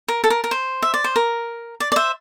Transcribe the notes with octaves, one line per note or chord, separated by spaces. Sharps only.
A#4
A4
A#4
A#4
C5
E5
D5
C5
A#4
D5
D5
C5 E5